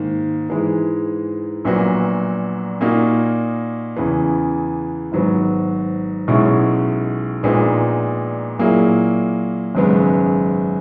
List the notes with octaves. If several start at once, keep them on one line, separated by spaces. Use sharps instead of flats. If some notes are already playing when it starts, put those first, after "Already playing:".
Already playing: G#2 D#3 A#3
G#2 E3 G#3
A#1 A#2 F#3 B3 F#4
A#2 A#3 D#4 F#4
E2 C#3 E3
G#1 G#2 F#3 B3
B1 B2 G#3 C#4 E4
A#1 A#2 G#3 B3 D#4
A#2 F#3 A#3 E4 G#4
G#1 F#2 C#3 G#3 B3